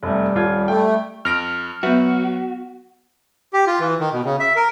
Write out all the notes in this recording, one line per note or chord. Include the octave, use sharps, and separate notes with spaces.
F1 G3 A3
D#1 F4 G#6
A3 G5
F2 F6 A#6 D7
F#3 B3 F#4 B4 E5
G4
F4
E3
D#3
B2
C#3
E5
A#4